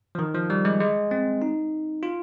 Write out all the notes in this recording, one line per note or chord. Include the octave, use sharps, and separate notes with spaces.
F3
D#3
F3
G3
G#3
G#3
C4
D#4
F4